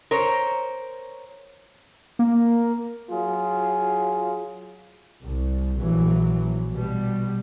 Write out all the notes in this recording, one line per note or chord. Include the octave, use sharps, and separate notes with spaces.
A#4 C5 C#5
A#3
F#3 F4 G#4
C2
A#1 E3 F#3
B2 G3